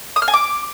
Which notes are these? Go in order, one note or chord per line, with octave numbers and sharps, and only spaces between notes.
D#6
F6
G#5
D6